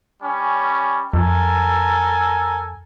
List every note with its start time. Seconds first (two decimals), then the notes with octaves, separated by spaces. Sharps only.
0.22 G3 C#4
1.13 F2 A4 A#4 G#5